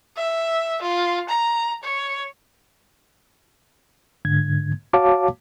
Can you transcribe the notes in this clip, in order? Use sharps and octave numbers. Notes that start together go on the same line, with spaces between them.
E5
F4
A#5
C#5
G#2 D3 G#6
F#4 C#5 F5 A5 D6